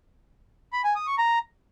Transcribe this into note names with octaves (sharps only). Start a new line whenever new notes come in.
B5
G#5
D#6
C#6
A#5